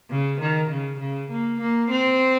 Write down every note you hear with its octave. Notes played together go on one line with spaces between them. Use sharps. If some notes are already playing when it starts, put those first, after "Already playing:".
C#3
D#3
C#3
C#3
A#3
A#3
C4